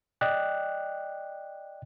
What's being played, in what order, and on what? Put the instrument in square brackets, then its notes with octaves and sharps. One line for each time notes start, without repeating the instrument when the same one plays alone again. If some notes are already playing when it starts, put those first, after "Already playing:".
[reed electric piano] D5 D#5 G5 F#6